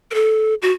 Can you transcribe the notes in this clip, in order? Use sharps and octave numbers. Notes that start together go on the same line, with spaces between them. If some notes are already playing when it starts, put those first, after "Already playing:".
A#4
A4
F#4